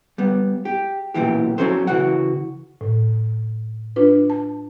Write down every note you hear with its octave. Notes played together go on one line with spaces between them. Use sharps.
G3 B3
G4
B1 G2 A#2 E3 G4
F#3 G3 C4 C#4 A4 C5
C#3 E3 F#4 F#5
A2
D4 F4 B4
A5